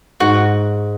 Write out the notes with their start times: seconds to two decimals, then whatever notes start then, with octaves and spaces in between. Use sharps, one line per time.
0.20 G#2 F#4